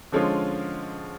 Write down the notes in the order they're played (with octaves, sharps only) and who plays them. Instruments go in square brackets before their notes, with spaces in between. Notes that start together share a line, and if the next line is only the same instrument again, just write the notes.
[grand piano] D3 F3 G#3 C#4 F4